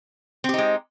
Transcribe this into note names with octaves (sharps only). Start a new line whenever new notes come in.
G#3 C4 D#4 G4